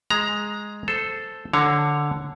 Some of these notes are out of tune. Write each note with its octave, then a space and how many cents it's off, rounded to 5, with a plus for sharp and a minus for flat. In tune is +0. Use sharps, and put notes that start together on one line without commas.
G#3 +0 A#5 +10
A4 +0 C5 -5
D3 +0 C#5 +0 A#5 +0